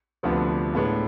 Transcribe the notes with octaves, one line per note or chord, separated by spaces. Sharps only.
D2 C3 F3 B3 D4
A2 G#3 B3 D4